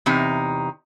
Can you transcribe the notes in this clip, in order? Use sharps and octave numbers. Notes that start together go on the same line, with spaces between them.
E2 C3 D#4